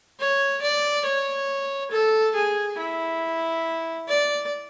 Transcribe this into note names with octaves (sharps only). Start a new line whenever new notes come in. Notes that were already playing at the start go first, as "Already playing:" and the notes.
C#5
D5
C#5
A4
G#4
E4
D5